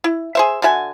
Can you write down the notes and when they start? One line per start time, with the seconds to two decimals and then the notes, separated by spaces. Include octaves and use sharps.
0.04 E4
0.35 G#4 C5 E5
0.62 D3 F#4 E5 G#5